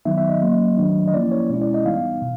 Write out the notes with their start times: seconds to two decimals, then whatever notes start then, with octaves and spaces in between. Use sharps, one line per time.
0.05 D#3 F#3 B3 D#4 E5
0.18 E5
0.29 D#5
0.42 F#3 A#3 C#4
0.77 D#3 F#3 A3 D4
1.08 D#5
1.14 F3 A#3 C#4 E4 D5
1.32 C#5
1.50 B2 G#3 C#4 E4
1.62 D5
1.74 D#5
1.86 E3 G3 B3 D#4 F5
2.22 B2